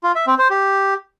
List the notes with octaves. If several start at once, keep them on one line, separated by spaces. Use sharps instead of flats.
F4
E5
C4
C5
G4